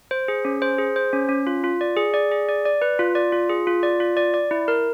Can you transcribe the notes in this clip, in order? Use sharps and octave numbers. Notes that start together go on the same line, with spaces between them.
C5
G#4
C#4
C5
G#4
C5
C#4
C#4
F4
F4
D5
G#4
D5
G#4
D5
D5
B4
F4
D5
F4
G#4
F4
D5
F4
D5
D5
E4
A#4